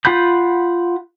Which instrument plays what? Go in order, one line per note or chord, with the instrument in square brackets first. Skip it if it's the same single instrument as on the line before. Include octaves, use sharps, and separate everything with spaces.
[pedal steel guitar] F4 F#5 B5 G6